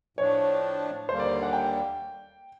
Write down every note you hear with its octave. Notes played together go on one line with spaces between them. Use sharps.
A2 F3 A3 D4 C#5
D#2 D3 G3 A#3 C5
D5
F#5
G5